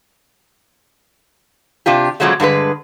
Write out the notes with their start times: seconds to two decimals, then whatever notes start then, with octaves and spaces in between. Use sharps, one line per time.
1.86 C3 D4 F4 G4
2.20 A#2 C#3 F3 F#3 G#3 A3
2.40 G2 D3 G#3 B4